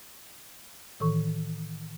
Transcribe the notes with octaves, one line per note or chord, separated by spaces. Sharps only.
A2 D#3 E3 A4 C#6